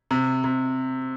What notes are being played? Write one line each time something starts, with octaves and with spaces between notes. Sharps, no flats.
C3
C3